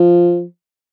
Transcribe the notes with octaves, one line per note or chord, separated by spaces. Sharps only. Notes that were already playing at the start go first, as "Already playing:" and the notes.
Already playing: F3